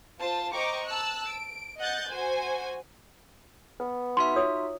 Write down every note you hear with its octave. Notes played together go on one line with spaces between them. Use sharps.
F4 C5 A5
C5 D#5 G5 A#5 C#6 D6
A5 E6 F#6
D7
D#5 F#5 F#6 G6 A6
F#4 C5 G#5
B3 B4
D#4 F#4 E5 C6
F4 C#5 D#6